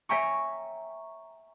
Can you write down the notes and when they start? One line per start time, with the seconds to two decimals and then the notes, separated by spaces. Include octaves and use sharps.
0.09 C#5 E5 G5 G#5 A#5 C#6